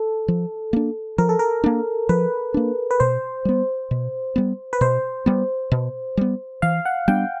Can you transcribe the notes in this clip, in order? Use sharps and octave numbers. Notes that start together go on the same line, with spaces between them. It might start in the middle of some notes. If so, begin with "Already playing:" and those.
Already playing: A4
F3
A#3 D4
F3 A#4
A4
A#4
A#3 D4
F3 B4
A#3 D4
B4
B2 C5
G3 B3
B2
G3 B3
B4
B2 C5
G3 B3
B2
G3 B3
E3 F5
F#5
G3 B3 D4 G5